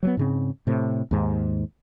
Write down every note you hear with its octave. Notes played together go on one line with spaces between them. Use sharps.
F#3 G3 B3
G#2 C#3 C4
A2 C3
D#2 G#2